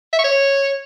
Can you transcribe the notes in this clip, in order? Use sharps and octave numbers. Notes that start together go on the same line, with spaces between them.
E5
C#6
C#5